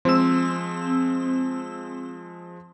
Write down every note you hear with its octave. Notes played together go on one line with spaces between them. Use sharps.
F3 G#3 C4 E6